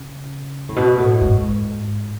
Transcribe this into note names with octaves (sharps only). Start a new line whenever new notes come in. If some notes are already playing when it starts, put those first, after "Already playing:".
Already playing: C#3
A2
B2
A2
G#2